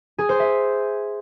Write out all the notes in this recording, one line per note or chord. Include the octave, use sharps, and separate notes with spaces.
G#4
C5
E5